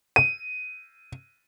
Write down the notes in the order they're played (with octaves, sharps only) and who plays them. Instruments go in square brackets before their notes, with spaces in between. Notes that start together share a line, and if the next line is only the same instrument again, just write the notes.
[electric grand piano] D#7